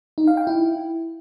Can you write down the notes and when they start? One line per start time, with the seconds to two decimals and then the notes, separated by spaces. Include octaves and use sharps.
0.18 D#4
0.27 F5
0.37 G5
0.47 E4